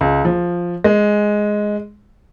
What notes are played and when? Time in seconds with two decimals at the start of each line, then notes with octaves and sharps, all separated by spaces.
0.01 C#2
0.25 F3
0.84 G#3